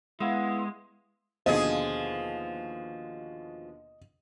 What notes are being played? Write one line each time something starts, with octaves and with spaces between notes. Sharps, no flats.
G#3 B3 E4 F5 F#5 E7
D#2 B2 D3 F3 G#4 D#5